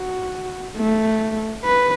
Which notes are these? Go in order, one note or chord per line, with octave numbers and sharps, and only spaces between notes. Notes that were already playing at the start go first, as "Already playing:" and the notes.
Already playing: F#4
A3
B4